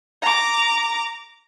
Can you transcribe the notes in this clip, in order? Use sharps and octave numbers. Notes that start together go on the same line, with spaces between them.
A#5 D6